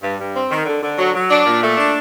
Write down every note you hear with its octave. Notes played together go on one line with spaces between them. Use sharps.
G2
G2
C4
D#3
D3
D3
F#3
F#3
D4
A#2
A3
D4